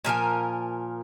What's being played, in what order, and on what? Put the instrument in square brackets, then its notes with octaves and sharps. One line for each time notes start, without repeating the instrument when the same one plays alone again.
[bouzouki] A#2 F3 A#4 G#5